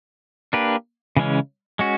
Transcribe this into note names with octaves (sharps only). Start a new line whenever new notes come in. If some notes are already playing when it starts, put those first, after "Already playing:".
A#3 D4 G4 B4
C#3 E3 G#3 C#4
G#3 C#4 F#4